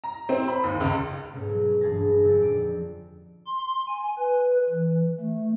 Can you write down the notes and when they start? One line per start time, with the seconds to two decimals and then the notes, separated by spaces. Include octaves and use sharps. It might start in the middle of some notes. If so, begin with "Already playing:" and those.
0.04 A#5
0.29 C4
0.48 B5
0.64 D#2
0.80 C#2
1.33 G#2 B2 A3 C#4
1.49 F#3
1.81 E1 G2 G#4 G#5 A5 A#6
2.23 F2 A#2 D3 F#3
2.40 C4 D5
3.46 C6
3.88 G#5
4.18 B4
4.70 E3
5.20 A3